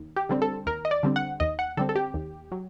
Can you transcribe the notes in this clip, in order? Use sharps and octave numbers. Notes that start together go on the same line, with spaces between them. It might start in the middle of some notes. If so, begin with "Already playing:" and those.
Already playing: D#2
G4
D3 G3 C4
A4
D#2 A#4
D#5
D5
D3 G3 C4
F#5
D#2 D#5
F#5
D3 G3 C4 A4
A4
G4
D#2
F#3